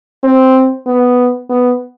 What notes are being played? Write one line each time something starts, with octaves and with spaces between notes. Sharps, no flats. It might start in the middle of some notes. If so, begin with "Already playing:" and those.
C4
B3
B3